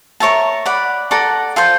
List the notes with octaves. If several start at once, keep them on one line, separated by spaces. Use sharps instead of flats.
A#4 C#5 E5 A5
D5 F#5 B5
A4 D5 F#5 A#5
F4 A4 C5